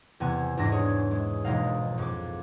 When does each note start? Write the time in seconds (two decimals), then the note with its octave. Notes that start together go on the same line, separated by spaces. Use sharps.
0.20 E2 C3 B3 G#5
0.57 E2 G#2 D4 A#6
0.72 G#4 C#5
1.11 G#3
1.45 E1 A#1 B2 G#3 D#4 F5
1.98 F2 D6